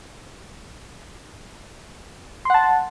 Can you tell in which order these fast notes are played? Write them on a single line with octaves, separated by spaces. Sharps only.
C6 F#5 A5